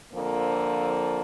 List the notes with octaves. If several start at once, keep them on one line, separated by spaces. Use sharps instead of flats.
F2 D3 F3 A#3